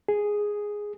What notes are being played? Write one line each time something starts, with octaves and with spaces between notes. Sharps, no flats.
G#4